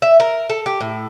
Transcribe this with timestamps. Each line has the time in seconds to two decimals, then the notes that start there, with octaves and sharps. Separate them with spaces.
0.02 E5
0.20 A#4
0.50 A4
0.66 G4
0.81 A2